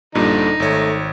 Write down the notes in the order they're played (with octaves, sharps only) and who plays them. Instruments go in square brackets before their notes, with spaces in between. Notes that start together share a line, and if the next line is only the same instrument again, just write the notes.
[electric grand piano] A#1 G2 A#2 [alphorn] D3 [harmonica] D#4
[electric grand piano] G#1 C#5 [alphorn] A3